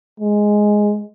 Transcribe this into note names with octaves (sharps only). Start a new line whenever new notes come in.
G#3